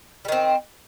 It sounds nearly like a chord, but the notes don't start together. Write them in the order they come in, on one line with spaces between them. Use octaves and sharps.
G3 D#3 C4